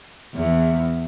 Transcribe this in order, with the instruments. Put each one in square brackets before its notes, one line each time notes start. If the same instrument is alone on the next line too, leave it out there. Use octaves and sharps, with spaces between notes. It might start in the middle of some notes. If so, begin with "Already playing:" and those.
[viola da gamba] E2